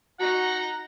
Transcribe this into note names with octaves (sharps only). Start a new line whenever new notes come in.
D#4 F#4 F#5 A#5